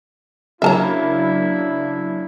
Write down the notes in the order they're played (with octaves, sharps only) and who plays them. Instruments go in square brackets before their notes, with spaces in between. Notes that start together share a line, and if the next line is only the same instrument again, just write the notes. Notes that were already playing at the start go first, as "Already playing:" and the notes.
[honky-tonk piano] C#3 F#3 A#3 [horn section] D4 E4 [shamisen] E5 A5 A#5